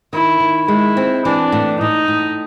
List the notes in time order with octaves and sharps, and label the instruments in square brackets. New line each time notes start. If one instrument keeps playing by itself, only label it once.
[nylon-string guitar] D#3 [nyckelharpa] E4
[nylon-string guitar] D#3
[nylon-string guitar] G#3 [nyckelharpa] E4
[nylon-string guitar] C4
[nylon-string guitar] E3 [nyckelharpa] D4
[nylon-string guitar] A2
[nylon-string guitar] A2 [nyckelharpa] D#4
[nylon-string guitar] A2